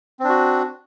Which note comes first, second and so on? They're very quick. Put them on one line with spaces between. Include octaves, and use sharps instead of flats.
C4 D4 F#4